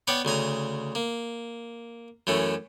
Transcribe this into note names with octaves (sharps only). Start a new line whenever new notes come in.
B3 B4 C#5 D5 G5
D2 C#3 G#5 A#5
A#3
F#2 E3 A3 C#4